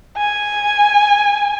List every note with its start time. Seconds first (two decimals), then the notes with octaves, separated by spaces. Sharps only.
0.18 G#5